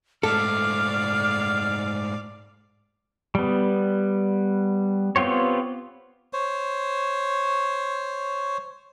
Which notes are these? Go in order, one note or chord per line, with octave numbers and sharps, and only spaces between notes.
G#2 A3 A4 D5 F5 F6
G3 B3
B3 C4 F4 G4 C#5
C5 C#5